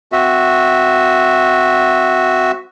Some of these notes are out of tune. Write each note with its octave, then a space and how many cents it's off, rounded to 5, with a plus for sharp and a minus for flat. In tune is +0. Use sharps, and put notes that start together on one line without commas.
C4 -15 F#4 -5 E5 -10